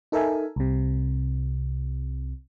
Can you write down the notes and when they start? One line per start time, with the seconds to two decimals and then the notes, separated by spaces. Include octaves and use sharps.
0.12 D#4 A4 A#4 E5 G#5
0.56 C2 C3